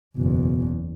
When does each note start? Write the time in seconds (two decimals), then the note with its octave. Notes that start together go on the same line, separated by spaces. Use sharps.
0.17 F#1 E2 B2